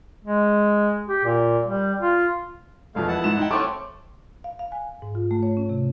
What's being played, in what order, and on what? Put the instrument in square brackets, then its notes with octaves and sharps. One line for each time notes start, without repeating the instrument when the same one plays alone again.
[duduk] G#3
G4
A#2
G3
F4
[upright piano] E1 F2 B2 [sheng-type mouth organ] A3 F5
[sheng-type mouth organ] E4 F#5 A5
[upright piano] G#2 E7
D#4 G5
[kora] A3 C4 C#4 [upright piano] D6
[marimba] F5
F5
G#5
G#2
F4
A3
C#5
C#4
C3